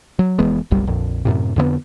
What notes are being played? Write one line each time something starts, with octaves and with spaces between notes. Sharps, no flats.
F#3
F1 E3 G#3 B3
F#1 B1 G3
A#1 F2
F#2 A2 C3
F2 D3 E3 B3